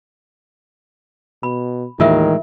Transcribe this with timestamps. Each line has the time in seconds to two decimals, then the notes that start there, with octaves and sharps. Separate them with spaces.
1.43 B2 B5
2.00 D#2 A2 D#3 E3 G#3 F4 A#4 E5